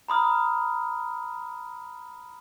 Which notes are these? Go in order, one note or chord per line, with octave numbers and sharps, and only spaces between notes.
A#5 B5 D#6 F6